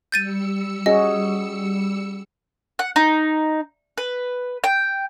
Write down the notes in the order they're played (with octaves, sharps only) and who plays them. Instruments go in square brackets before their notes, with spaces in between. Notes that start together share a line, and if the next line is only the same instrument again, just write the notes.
[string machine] G3 E6 C#7 [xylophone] G6 A6 D#7
[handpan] C#4 F#4 G#4 [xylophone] D#5
[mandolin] F#5
D#4
B4
G5